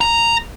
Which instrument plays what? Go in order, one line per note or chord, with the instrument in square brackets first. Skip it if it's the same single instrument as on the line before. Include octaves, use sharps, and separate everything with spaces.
[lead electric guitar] A#5